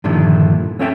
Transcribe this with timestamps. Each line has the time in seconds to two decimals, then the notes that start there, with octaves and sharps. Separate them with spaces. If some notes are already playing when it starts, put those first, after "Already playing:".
0.04 G2 A#2 D3 D#3 F3 E4
0.79 C4 C#4 A4 C#5 E5 G5